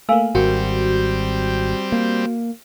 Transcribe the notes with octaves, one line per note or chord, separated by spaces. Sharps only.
A3 A#3 F5 G#5 E6
G#1 G3 C4 F#4 A#4
A#3